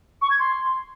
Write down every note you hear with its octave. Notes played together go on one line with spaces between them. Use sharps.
C#6
G#6
C6